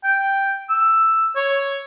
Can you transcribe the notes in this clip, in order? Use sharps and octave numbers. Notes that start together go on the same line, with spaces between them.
G5
E6
C#5